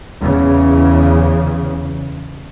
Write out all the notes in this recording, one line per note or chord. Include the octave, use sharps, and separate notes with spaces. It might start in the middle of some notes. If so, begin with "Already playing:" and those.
E2 C#3